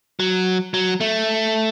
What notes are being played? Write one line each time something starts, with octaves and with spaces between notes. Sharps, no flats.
F#3
F#3
A3